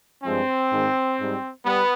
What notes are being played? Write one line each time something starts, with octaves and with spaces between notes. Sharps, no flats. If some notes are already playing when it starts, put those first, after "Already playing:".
G2 F3 G#3 C4
G#2 D#3 G#3
G#2 G3
G3 B3